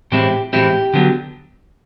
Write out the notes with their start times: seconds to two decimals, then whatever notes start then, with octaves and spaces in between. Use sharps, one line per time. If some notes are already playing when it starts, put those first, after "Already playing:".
0.12 A2 E3 G#3 C4 E4 G4
0.53 A2 E3 G#3 C4 E4 G4
0.93 D3 F#3 B3